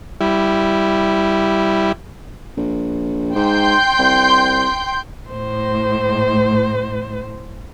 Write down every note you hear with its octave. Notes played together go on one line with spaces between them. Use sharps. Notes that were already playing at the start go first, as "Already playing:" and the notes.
G3 E4
A#1
G#2 G5 C6 G6
C2
A2 C5